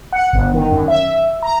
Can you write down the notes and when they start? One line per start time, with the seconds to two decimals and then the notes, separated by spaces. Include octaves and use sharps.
0.12 F#5
0.33 G1
0.54 D#3
0.71 F#2
0.88 E5
1.43 A#5